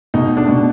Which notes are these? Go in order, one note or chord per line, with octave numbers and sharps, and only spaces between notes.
B2 D#4
D4
B2